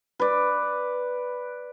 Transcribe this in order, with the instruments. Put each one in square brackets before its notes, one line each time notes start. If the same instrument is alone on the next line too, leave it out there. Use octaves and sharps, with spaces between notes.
[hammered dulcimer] B4 D5